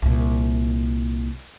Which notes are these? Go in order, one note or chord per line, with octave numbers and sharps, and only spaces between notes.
C2 A#2